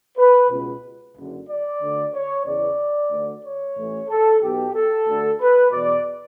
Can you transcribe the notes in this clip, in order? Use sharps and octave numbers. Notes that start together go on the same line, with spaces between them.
B4
C#2 B2
F#1 F#2 D3
D5
D2 D3
C#5
E2 C#3 E3 D5
D2 D3
C#5
A1 A2 E3
A4
B1 B2 G4
A4
D2 D3
B4
E2 B2 D5